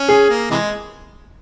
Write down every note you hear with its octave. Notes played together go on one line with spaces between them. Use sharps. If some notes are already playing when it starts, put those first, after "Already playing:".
Already playing: C#4
G#4
A#3
C3 E3 G#3